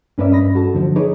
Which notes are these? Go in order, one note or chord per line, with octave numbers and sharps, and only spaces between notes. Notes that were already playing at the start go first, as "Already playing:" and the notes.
G2 C#4 A#4 B4 D5 E5
D#5 B5 A#6
G2
F#4 A4 A5
D3 F3
D#4 G#4 B4 C#5 D#5 D6